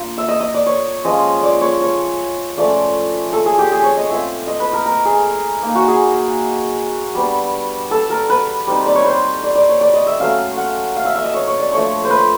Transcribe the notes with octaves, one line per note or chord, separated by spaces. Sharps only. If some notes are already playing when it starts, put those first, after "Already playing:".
Already playing: A#3 D4 F4
E5
D#5
D#5
D5
C#5
F3 G#3 C#4 F4 D#5
D5
C#5
C#5
F3 A3 C#4 F4 D5
A4
G#4
G4
G#4
C#5
D#5
A3 C4 F4 E5
D#5
B4
A#4
A#4
G#4
A#3 D#4
F#4
G#4
G3 B3 D4
A4
A#4
B4
G3 C4 D#4
D5
C#5
C5
D5
D5
C#5
D5
D#5
E5
F#3 A3 C#4 F5
F#5
F5
E5
E5
D#5
C#5
C#5
D5
F3 A3 D4 C#5
C5
B4